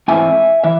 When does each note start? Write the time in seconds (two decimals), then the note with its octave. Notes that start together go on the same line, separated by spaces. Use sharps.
0.08 G#2 E3 A3 C4 E5 G#5
0.64 E3 E5